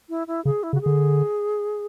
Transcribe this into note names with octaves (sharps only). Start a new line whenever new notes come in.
E4
E4
C#3 G#4
E4
C#3 F#4
D3 G#4